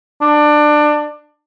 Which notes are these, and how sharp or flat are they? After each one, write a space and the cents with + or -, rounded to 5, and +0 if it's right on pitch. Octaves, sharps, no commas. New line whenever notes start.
D4 +20